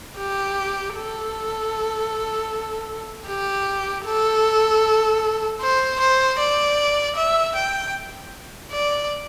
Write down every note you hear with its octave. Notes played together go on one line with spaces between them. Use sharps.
G4
A4
G4
A4
C5
C5
D5
E5
G5
D5